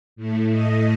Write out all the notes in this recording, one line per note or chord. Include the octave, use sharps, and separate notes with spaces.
A2 A3
D#5